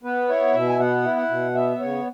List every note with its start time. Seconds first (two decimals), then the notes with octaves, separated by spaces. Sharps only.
0.03 B3 B4
0.28 E4 C#5
0.54 B2 E5
0.69 G#5
0.79 B3 F#5
1.04 E4
1.16 F#5
1.30 B2
1.55 B3 E5
1.80 C#3 C#5